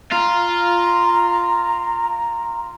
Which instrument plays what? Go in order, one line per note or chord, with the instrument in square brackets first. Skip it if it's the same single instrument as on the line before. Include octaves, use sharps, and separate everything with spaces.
[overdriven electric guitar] F4 [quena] A#5